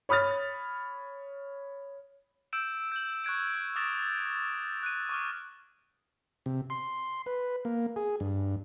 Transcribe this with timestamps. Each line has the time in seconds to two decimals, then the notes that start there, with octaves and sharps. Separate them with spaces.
0.09 C#5 B5 D#6 F6 A6
2.53 E6 G6 D7 E7
2.92 G6 F#7
3.25 C#6 F#6 G#6 D7
3.76 D6 D#6 F6 A6 A#6 E7
4.83 F#6 D#7
5.09 C#6 D6 F6
6.46 C3
6.70 C6
7.26 B4
7.65 A#3
7.96 G#4
8.20 G2